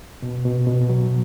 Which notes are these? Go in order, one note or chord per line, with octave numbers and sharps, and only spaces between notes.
B2
B2
B2
F#3